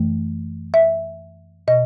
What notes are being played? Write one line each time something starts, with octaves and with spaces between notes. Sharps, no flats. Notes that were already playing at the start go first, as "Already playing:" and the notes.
Already playing: F#2 E3 A3
E5
B2 D#5